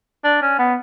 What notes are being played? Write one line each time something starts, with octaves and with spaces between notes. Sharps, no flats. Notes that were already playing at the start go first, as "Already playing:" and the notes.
D4
C#4
B3